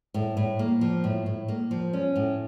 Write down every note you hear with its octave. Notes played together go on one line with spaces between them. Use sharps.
A2
A2
A#3
F3
A2
A2
A#3
F3
C#4
A2